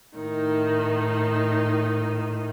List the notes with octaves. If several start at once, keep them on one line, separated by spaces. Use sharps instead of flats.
A2 D#3 D#4